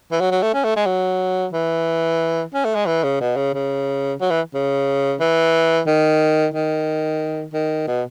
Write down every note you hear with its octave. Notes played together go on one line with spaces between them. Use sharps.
E3
F#3
F#3
A3
C#4
A3
G#3
F#3
E3
C#4
A3
G#3
E3
C#3
B2
C#3
C#3
F#3
E3
C#3
E3
D#3
D#3
D#3
B2